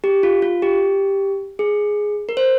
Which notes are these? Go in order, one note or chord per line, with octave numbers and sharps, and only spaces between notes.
G4
F4
F4
G4
G#4
A#4
C5